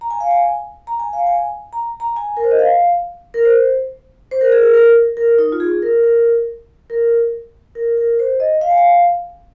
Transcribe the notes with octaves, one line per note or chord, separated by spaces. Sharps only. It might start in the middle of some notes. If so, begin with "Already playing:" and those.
A#5
G#5
F5
G#5
A#5
G#5
F5
G#5
A#5
A#5
G#5
A#4
C5
D#5
F5
A#4
C5
C5
A#4
G#4
A#4
A#4
A#4
D#4
F4
G#4
A#4
A#4
A#4
A#4
A#4
C5
D#5
F5
G#5
F5